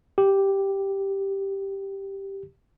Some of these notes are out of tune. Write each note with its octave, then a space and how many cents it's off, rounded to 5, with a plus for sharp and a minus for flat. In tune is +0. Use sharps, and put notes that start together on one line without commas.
G4 +0